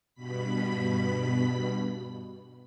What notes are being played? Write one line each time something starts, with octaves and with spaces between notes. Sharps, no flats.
G2 B2 B5 B6